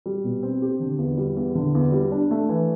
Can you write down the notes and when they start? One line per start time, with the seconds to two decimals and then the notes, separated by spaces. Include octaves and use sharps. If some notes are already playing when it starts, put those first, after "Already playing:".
0.06 G3
0.24 B2
0.43 C4
0.62 G4
0.80 D3
0.99 E2
1.18 G3
1.37 E2
1.55 D3
1.75 E2
1.92 G3
2.12 D4
2.31 A3
2.49 E3